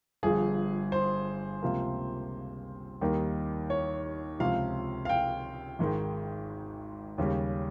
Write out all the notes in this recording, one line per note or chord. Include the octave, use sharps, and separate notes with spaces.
G1 G2 F3 G#4
C5
C#2 C3 F3 A#3
D#2 D#3 G3 A#3 D#4
C#5
C#2 C3 F3 F5
F5
G5
G#1 G#2 D#3 G#3
D#2 C#3 G3 C#4